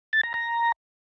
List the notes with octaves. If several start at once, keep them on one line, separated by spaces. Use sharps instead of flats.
A6
A#5
A#5